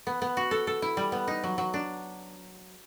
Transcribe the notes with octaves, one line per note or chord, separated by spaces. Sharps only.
B3
B3
F#4
A4
A4
E4
G3
B3
D#4
F#3
F#3
D4